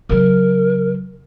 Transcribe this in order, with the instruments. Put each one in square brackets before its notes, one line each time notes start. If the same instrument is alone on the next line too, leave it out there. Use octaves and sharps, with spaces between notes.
[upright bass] C#3 F#3 [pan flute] A#4